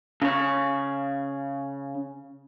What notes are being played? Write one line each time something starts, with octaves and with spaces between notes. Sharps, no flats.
C#3 C#5